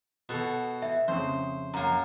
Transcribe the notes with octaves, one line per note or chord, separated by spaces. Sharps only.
B2 F#4 A4
E5
F2 C#3 C5
F#2 A#3 A#5